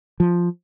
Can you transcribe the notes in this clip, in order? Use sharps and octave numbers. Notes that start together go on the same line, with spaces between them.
F3